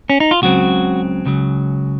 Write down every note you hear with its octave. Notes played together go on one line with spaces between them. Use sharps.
C#4
D#4
F4
C#2 C#3 F#3 C4 F#4
C#2 C#3 F#3